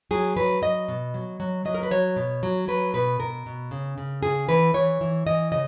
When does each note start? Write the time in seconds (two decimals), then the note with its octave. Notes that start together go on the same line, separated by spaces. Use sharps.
0.11 F#3 G#4
0.37 F#3 B4
0.62 F#3 D#5
0.88 B2
1.14 F#3
1.40 F#3
1.65 F#3 D#5
1.74 A#4
1.83 B4
1.91 F#3 C#5
2.16 B2
2.43 F#3
2.68 F#3 B4
2.94 B2 B4
3.20 B2 A#4
3.46 B2
3.71 C#3
3.98 C#3
4.23 C#3 G#4
4.49 E3 B4
4.74 E3 C#5
5.01 E3
5.27 E3 D#5
5.52 C#3 D#5